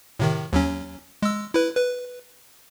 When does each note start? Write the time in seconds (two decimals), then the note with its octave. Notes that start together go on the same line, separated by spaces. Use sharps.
0.20 A2 C3 D#3
0.53 D#2 F#3 C#4
1.22 G#3 E6
1.54 E4 B4
1.77 B4